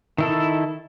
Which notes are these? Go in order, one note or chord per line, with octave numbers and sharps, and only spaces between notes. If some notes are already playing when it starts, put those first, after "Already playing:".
D#3 E4 A4